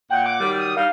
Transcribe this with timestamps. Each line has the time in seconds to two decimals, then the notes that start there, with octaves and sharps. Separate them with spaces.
0.10 A#2 F#5 G5
0.26 D6
0.39 D#3 F#3 G3
0.58 D#6
0.77 G3 D4 D#4 F5